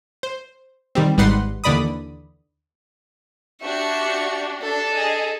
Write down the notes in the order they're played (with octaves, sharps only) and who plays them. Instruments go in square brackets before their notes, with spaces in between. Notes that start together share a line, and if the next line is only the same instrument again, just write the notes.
[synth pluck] C5
D#3 G3 C4
G#1 G3 D#4 B4 F#5 C6
D#2 D3 E3 D5 B5 D#6
[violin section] D4 F#4 G4 [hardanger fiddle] E5 C#6
[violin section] D4 [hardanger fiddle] A4
[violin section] G#4 D#5